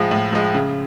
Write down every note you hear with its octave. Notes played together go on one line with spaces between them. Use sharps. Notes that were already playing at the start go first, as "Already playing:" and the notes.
Already playing: A2 F3 G#3
A2
F3 G#3
C#3